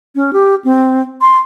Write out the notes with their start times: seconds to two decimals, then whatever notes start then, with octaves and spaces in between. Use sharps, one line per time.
0.15 C#4
0.33 G4
0.65 C4
1.21 C6